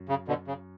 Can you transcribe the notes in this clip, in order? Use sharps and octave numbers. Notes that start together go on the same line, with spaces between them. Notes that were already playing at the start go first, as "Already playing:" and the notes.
Already playing: F#2
C#3
B2 D3
C#3